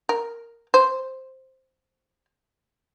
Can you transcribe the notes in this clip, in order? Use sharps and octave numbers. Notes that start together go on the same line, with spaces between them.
A#4
C5